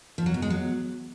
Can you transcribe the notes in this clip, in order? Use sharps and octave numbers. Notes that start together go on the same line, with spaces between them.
F3
F#3
B2
G#3
F#3